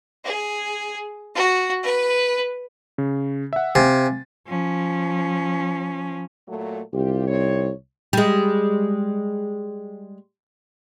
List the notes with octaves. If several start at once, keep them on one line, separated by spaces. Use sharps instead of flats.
G#4
F#4
B4
C#3
E5 F#5
C3 F5 G#5 A6
F3 C#4
A#2 F#3 A3
C2 F4 G4
C4 D#4 C#5
G3 G#3